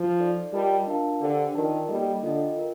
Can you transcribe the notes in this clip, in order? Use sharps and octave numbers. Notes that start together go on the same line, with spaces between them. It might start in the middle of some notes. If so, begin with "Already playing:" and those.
Already playing: F3
D#4 A4 D5
G3 F4 A#4 D#5 A5
D4 F4 A#4 F5 A5
D3 D4 G4 C5 G5
D#3 F4 A#4 D5 A5
G3 A#3 D#4 A4 D#5
D3 F4 A4 D#5 G5
F4 A#4